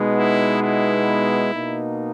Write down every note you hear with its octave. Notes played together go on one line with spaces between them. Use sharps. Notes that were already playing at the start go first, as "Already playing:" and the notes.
Already playing: B2 G#3 B3 D#4
E4
E4
B2 A#3 D#4